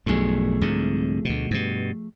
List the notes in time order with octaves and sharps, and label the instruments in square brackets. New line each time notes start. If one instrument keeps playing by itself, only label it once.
[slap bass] B1 G2 [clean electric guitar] F3 A3 G#4
[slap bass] C2 G#2 D3
D2 B2
G2 B2